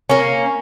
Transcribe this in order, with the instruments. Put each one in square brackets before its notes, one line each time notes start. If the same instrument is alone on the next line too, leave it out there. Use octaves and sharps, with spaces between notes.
[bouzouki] A#3 C#4